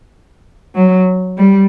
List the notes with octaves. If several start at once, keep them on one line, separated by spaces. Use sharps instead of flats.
F#3
G3